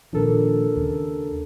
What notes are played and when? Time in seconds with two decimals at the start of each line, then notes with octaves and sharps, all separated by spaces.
0.13 A#2 D#3 F3 D4 A4 A#4
0.76 D#2 C#3